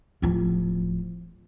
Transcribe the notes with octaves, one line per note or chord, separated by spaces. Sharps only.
D1 F3